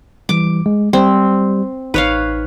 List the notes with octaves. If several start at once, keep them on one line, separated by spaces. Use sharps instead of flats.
E3 G3 D6
G#3
G3 C4
A1 D#4 B4 C#5 F5 F#6